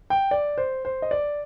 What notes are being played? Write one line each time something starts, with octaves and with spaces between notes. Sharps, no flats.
G5
D5
C5
C5
D#5
D5